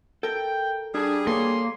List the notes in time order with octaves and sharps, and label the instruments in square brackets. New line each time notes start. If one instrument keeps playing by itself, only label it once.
[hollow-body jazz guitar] A4 A#4 [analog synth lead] G5
[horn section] G3 G#4 [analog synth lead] D4
[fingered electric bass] A#3 [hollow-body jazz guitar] A4 B4 C#5 [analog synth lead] C6